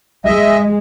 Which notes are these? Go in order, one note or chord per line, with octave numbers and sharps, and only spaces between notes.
G#3 D#5 E5